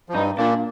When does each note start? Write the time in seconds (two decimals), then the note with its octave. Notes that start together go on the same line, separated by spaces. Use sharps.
0.09 F3
0.14 G2 G3 D#4
0.38 A#2 A#3 D4